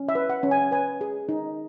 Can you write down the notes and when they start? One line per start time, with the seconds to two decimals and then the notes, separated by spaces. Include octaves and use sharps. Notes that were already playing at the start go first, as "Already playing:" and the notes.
Already playing: C#4
0.08 E5
0.15 B4
0.30 F#5
0.43 C#4
0.51 G#5
0.71 B4 G#5
1.01 G#4
1.29 D#4